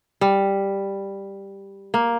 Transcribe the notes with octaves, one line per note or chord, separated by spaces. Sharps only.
G3
A#3